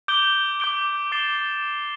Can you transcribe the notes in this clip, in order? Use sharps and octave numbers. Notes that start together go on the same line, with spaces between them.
D6 G6 D7 G7
D6 G6 D7 G7
D6 A6 C7 E7 G7